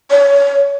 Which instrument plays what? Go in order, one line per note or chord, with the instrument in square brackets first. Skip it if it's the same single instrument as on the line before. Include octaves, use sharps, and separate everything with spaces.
[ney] C#5